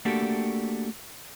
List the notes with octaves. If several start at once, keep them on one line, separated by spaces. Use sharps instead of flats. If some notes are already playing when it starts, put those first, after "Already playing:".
A3 A#3 D4 F#4 G4 A4